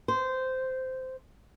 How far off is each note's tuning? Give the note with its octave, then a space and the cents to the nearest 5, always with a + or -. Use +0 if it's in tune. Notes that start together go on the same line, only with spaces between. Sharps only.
C5 -15